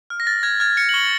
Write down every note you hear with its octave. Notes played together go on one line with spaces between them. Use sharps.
F6
A#6
F6 A6
F6 G#6
F6 G#6
F6 C#7
F#7
C#6 G7